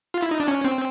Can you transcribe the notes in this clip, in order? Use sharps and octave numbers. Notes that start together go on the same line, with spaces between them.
F4
E4
D#4
D4
C#4
C4